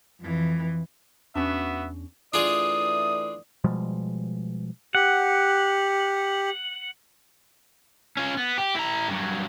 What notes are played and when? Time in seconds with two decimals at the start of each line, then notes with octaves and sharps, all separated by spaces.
0.21 F2 E3
1.35 E2 B3 C#4 D4 F#4 E5
2.34 E3 A3 D4 F4 G#4 D5 D#6
3.64 B2 F3 G3 G#3
4.95 G4 F#5
8.17 C#4 F4
8.37 B3
8.58 G4
8.75 E4 A#5
9.08 G2 F#3